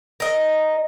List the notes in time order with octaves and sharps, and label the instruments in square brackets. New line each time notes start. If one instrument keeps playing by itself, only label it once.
[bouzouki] A#4 D#5